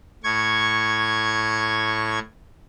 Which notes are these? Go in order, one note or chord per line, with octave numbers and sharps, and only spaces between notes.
A2 C#6 G#6